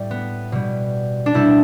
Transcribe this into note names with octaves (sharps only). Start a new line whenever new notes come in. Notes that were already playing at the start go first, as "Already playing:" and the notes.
Already playing: A2 G3
B3
B2 G3
D4
B2 G3 E4